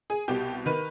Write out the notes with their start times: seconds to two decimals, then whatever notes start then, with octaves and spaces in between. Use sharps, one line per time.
0.10 G#4
0.28 C2 B2 G4
0.66 D#3 B4